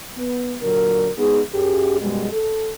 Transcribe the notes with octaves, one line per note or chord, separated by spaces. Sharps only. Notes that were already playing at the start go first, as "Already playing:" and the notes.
B3
A#2 D3 F#3 A#4
G#3 B3 D#4 G#4
F#2 G4 G#4
F#2 B2 G3 G#3
A4